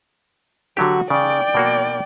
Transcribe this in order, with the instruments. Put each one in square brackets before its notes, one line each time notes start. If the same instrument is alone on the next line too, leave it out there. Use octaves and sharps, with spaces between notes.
[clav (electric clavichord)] D3 F#3 G4 [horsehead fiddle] F#4
[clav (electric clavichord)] C#3 [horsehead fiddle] D5 G5
[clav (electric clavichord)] B2 A#3 F#4